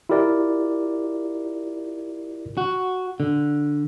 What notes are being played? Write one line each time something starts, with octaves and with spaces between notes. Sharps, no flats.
E4 F4 G4 A#4 D5
F#4
D3